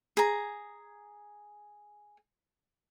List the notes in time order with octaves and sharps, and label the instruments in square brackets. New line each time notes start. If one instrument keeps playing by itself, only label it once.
[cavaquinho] G#4 A#5